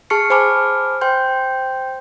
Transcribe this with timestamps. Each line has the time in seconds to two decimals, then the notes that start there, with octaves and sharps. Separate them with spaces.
0.10 G#4 A5 C#6 F6 C7 C#7
0.30 C5 G#5 A5 B5 D6 F6
1.01 C5 G5 C6 G6